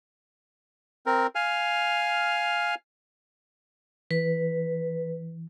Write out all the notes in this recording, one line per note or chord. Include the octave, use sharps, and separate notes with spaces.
C4 A#4
F5 G#5 F6
E3 B4